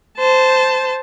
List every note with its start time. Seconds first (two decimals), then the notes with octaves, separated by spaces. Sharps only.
0.18 C5 A5